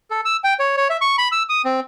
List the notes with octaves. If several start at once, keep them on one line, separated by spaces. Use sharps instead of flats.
A4
E6
G5
C#5
C#5
E5
C#6
B5
E6
D#6
C4